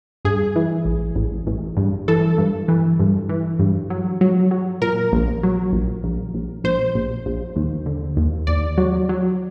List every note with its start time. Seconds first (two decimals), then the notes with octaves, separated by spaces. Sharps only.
0.25 G2 G#4
0.56 E3
0.85 A1
1.16 A1
1.47 A1
1.77 G2
2.08 E3 A4
2.38 G2
2.68 E3
2.99 G2
3.29 E3
3.59 G2
3.90 F#3
4.21 F#3
4.51 F#3
4.81 A#2 A#4
5.12 A#1
5.43 F#3
5.73 A#1
6.04 A#1
6.34 A#1
6.64 A#1 C5
6.95 A#1
7.26 A#1
7.56 D#2
7.86 D3
8.17 D#2
8.47 D#2 D5
8.77 F#3
9.09 F#3